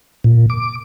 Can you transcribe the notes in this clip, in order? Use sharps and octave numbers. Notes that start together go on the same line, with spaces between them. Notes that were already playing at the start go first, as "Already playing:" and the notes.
A#2
D6